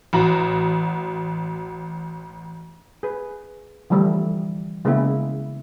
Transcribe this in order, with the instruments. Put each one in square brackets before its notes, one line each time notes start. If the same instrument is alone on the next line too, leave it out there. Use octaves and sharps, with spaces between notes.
[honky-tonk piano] A1 F#4 A#5
[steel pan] G#4 B4
D3 E3 F3 G3 A3
C#3 G#3 A#3 B3 C#4 E4